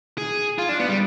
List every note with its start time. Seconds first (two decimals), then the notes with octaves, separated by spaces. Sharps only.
0.18 G#4
0.58 F4
0.69 D4
0.80 B3
0.89 G3